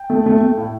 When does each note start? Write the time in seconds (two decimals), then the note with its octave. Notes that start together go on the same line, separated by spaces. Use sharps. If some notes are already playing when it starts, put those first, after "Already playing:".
Already playing: G5
0.10 A3
0.26 A3
0.41 A3
0.57 A2